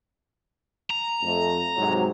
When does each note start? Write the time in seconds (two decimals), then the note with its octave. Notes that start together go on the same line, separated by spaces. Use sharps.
0.90 A#5
1.22 F2 A3
1.76 G#2 C3 F#3